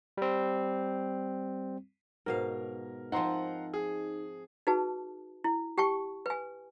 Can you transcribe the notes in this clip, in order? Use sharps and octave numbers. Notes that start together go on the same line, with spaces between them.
G3 C4
G#2 B2 A#4 F5
F3 C4 D#4 F#5 A#5 C6
G#4
D#4 F#4 G#4 B4 A5
E4
G4 G5 A5 C#6
B4 G#5